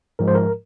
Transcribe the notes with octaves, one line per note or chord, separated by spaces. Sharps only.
G#2 F3 G#3 A#4
C5
A#4